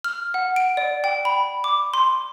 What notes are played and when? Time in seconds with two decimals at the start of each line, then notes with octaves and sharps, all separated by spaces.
0.04 F6
0.34 F#5
0.56 D7
0.77 D5
1.04 G5
1.25 B5
1.64 D6
1.94 C6